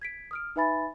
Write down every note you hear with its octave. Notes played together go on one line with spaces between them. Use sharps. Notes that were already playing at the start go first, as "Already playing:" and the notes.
G#6 B6 D7
D#6 F6 D7
D#4 B4 E5 G#5 B5 A6